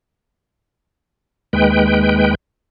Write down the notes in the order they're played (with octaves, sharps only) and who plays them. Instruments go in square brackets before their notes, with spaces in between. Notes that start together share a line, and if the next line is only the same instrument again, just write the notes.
[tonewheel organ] D#2 G#3 B4 G5